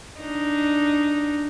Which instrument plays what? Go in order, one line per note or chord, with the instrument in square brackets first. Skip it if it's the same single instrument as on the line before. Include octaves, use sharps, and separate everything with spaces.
[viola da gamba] D4 D#4